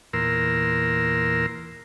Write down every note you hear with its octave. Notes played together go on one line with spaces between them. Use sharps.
E2 A#2 A#4 C6 E6